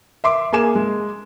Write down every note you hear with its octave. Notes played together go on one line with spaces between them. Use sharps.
E5 C6 D6
A#3 G#4 G#5 D6 E7
G#3